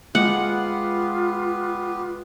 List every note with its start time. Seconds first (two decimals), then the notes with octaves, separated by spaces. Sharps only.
0.15 G#3 B3 F4 G4 B4 F#5